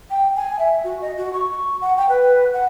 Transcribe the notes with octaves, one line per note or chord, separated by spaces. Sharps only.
G5
G#5
E5
F#4
D#5
F#4
C#6
F#5
G5
B4
F#5